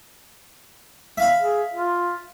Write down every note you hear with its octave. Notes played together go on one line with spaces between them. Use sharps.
E5 F5 B5
G#4
F4